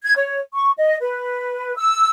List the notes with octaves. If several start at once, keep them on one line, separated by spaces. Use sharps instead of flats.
G#6
C#5
C#6
D#5
B4
E6